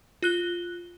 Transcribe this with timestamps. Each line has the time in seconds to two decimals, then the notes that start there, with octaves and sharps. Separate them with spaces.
0.22 F4 F#6 G7